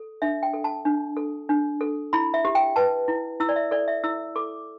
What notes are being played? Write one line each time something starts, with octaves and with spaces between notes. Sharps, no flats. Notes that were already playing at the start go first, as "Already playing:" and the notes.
Already playing: A4
D4 E5
G5
A4
A5
D4
A4
D4
A4
E4 B5
E5
G4
G5
B4 A5
E4
E4 E6
D5
E5
A4 D5
E5
E4 E6
A4 D6